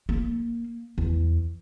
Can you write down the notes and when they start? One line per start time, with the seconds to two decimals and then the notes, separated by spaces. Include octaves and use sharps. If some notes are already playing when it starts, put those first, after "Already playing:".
0.09 A#3
0.98 E2